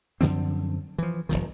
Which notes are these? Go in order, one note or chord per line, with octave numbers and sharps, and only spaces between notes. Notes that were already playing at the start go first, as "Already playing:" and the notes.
F#2 D3 F3 C4
E3 F3
D1 C2 F2 D#3